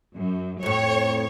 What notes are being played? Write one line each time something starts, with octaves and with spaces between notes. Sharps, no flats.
F#2
F2 A2 C#5